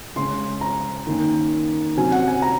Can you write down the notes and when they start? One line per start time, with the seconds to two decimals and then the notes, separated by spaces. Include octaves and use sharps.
0.16 C#3 G#3 C#4 C6
0.61 A#5
1.07 D#3 A#3 C#4
1.97 C3 F#3 C#4 G#5
2.12 F#5
2.28 G#5
2.42 A#5